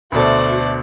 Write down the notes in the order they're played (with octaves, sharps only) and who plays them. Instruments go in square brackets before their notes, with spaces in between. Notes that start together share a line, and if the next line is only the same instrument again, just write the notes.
[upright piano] D2 B2 A4 [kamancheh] A3 D5 [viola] F#4 C5